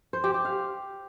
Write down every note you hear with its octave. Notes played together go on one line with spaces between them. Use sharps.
C5
G4
G4
F5